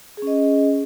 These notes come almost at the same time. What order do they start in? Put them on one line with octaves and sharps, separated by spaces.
G#4 C#4 D#5